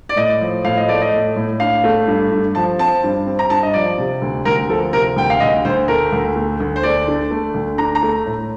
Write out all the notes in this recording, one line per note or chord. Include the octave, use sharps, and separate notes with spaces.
D5
A2 D#5
F3
A2 F5
D#5
A3 D5
D#5
A2
A2
D4 F5
A3
G2
G2
F3 A5
C4 A5
G2
C4
A#5
G2 A5
D#5
F3 D5
C3
D2
D2 A#4
F3 A4
C3 A#4
D2 G5
F5
D2 D#5
D2 C5
A3 A#4
D2
A3
D2
C5
A3 D5
D3
A3
D2
D4 A#5
A#5
A3
A2